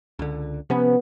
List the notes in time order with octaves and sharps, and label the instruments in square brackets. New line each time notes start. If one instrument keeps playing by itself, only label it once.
[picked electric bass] C#2 D3
[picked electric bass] C3 F3 C#4 [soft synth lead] B3